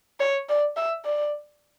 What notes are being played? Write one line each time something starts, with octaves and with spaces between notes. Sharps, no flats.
C#5
D5
E5
D5